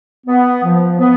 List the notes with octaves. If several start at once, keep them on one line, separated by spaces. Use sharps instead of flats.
B3
F3
B3